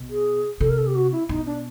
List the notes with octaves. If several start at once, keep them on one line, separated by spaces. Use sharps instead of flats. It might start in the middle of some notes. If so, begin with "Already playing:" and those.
Already playing: B2
G#4
C3 A4
A#4
A4
G4
F#4
E4
B2 D#4
D4